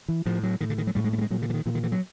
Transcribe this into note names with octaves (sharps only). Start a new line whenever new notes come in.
E3
A2 F3
F#3
A2 D#3
D3
D#3
F#3
A2 G3
G#3
A3
G3
G#3
A#2 F#3
D3
E3
D#3
A#2 E3
D#3
E3
F#3